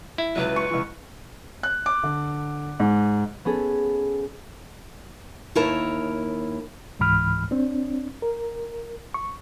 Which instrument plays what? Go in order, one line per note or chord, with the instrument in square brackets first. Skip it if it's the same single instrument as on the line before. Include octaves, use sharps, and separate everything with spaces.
[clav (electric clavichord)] E4
[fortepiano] C#2 F#3 [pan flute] B4
[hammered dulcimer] C#6
[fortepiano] C#2 E3
[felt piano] F#6
D6
D3
G#2
[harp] B3 C#4 G#4 A4
[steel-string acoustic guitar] D#2 E4 A#4 C#5 A5
[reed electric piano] C#2 G#2 E3 B5 F6
C4 D4
A#4
C#6